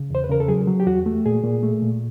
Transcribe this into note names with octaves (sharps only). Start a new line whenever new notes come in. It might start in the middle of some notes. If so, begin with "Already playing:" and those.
Already playing: C#3
E2 C5
B4
C#3 A#4
A4
F#3 G#4
F#3
G4
E2 F#4
A3
A#2 G#4
A#2
A3
A#2